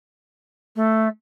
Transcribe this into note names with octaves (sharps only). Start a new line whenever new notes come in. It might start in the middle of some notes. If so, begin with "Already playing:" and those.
A3